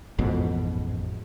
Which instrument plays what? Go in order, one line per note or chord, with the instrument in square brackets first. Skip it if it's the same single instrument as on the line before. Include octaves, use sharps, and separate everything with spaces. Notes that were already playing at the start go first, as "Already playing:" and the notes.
[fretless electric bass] A1 F2 G#2 B2